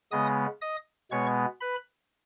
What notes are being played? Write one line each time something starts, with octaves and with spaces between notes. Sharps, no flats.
C#3 G#3 B3 D#5 D#6
D#5 D#6
B2 G#3 B3 C#5 C#6
B4 B5